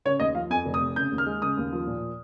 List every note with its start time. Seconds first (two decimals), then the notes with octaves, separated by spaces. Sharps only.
0.05 C#3 C#5
0.20 D#2 D#5
0.35 F3 F5
0.50 F2 G#5
0.66 F1
0.74 D#6
0.81 C3
0.96 C#3 G6
1.12 D#2
1.18 F6
1.26 G#3
1.42 C#3 D#6
1.57 D#2
1.73 F3
1.87 A#2